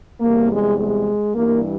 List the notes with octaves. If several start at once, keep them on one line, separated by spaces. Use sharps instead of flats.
E2 C3 G3 A#3
G#3
G#3
G2 E3 G3 A#3